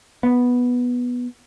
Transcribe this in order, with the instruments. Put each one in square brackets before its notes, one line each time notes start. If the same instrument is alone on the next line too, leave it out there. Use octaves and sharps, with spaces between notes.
[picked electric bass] B3